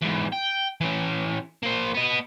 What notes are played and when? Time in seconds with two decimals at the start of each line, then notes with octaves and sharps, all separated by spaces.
0.02 E2 G#2
0.32 G5
0.81 E3 C#4
1.63 A#3 C5
1.94 B3 D#5